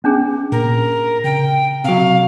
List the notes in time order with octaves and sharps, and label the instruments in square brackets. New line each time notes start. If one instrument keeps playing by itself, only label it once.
[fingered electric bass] B3 [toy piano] C#4 D4 G#4
[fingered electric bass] A#2 [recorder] A#4
[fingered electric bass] C#3 [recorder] G5
[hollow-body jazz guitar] C3 F#3 [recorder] F5